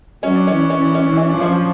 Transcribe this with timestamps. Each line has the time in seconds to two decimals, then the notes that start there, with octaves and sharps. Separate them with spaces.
0.23 F#3 C#4
0.35 D4
0.47 E3 C#4
0.58 D4
0.70 C#4
0.81 E3 D4
0.94 C#4
1.06 E3 D4
1.17 C#4
1.29 D4
1.37 F3 C#4